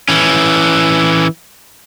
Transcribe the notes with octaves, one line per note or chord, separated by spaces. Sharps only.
E3 C#4